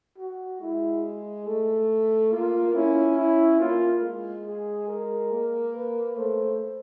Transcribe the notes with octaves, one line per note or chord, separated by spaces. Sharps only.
F#4
G#3 E4
A3
A#3 F4
C#4 E4
E4
A#3 F4
G#3
G#4
A#4
A#3
B4
A3 C5